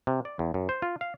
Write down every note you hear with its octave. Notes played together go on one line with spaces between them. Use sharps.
C3
D5
E2
F#2
C5
F4
F5